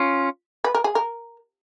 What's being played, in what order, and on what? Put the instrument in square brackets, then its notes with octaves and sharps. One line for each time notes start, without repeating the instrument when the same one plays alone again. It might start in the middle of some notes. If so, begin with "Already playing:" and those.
Already playing: [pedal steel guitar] C#4 F4
[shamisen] B4
A#4
G#4
A#4